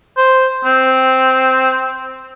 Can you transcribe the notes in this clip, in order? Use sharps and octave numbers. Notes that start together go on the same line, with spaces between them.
C5
C4